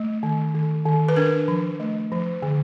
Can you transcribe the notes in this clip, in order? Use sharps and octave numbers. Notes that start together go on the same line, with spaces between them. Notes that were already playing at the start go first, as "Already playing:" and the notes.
Already playing: A3
D#3
D#3
D#3
B4
D4 A#4
F3
A3
F3
D3